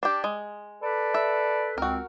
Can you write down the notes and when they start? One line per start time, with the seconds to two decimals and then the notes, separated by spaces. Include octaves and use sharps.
0.03 D4 G4
0.24 G#3
0.82 A4 B4 D5
1.14 E5
1.78 C#2 C4 F#4 A#4